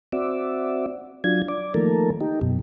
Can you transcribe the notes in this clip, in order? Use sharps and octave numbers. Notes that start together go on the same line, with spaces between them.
C4 F#4 D5 E5
F#3 D4 F4 G#6
D5
D#3 F3 A3 A#3 A4 A#4
D#4 G4
F#2 B2